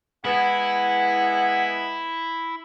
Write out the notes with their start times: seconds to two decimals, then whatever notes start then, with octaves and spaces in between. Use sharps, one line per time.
0.25 G#3 B3 E4 F#5